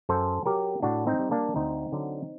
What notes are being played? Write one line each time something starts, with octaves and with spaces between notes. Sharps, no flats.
F#2 A4 C5
F#3 G4 A#4
A2 D4 F#4
C4 D#4
G3
A#3 D4
D2 C4 D#4
D3 F#3